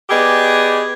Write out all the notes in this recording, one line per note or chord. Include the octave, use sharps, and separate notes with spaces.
B3 G4 G#4 D5 D#5